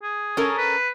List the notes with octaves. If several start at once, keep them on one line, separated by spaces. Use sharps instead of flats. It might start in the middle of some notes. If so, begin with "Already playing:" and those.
G#4
C#4 A4 A#4
B4